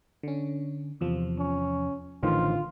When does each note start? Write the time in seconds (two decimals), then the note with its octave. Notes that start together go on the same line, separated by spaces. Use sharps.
0.23 D3 C#4
1.01 E2 C3 F3
1.39 C#4
2.23 A1 D3 D#3 F3 F4